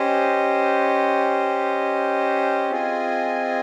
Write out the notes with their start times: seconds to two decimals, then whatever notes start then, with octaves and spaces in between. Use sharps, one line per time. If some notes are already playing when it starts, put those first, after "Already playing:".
Already playing: C#4 G4 C5 D#5
2.70 C4 F4 G#4 D#5 G#5